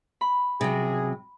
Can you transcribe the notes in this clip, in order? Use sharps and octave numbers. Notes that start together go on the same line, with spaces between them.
B5
G#1 C#2 C3 F#3 G#4